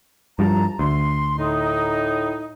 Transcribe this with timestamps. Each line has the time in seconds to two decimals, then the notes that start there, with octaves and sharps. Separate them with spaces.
0.39 C2 G2 F3 G3 A5 A#5
0.79 D2 C6
1.38 A2 D#4